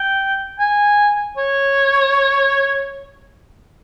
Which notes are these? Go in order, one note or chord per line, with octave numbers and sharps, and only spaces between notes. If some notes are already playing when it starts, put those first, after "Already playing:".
Already playing: G5
G#5
C#5